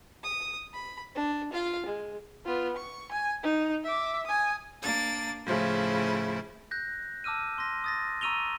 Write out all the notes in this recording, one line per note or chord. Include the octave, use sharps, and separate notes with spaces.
D#6
B5
D4
F4 F5
G#3
B3 F4
C#6
G#5
D#4
E5 D6
G#5 D#6
A#3 D4 A6
A2 C#3 F3 E4
F#6 G6 A#6
A5 D6 E6 F6 D#7
C6 A#6
D#6 A6 A#6
A#5 C#6 E6 D#7 F7 G7